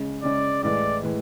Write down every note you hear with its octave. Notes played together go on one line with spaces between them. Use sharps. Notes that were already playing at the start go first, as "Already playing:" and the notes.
Already playing: C#3 G#3 C#4
C#3 G#3 C#4 D5
A2 E3 G#3 D5
A2 E3 G#3